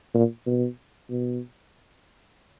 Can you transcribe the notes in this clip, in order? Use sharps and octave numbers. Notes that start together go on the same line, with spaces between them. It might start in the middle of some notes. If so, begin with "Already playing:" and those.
A#2
B2
B2